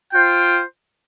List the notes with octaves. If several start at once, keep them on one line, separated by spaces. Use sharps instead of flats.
F4 C5 G5